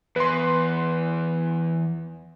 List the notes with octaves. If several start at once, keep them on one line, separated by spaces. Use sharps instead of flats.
E2 B4 C6